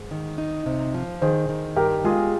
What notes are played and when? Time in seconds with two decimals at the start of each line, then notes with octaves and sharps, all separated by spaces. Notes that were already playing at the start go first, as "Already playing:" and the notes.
Already playing: G#2
0.11 D#3
0.38 D#4
0.66 C3
0.94 F3
1.21 D#3 G#4 C5
1.49 D#3
1.76 G2 G4 A#4
2.04 G#3 F4 G#4